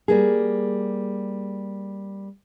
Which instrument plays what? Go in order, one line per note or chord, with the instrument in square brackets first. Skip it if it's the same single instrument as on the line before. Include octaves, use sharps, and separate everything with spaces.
[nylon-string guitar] G3 A#3 G#4